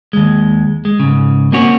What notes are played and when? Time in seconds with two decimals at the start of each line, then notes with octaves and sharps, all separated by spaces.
0.13 D#2 G#3
0.85 G#3
0.99 G#2 C#3
1.52 A#3 C4 C#4 F#4 C#5